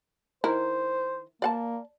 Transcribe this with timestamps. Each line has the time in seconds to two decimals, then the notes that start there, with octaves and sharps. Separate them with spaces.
0.44 D#3 E4 A#4 C5
1.42 A#3 D5 F#5 A5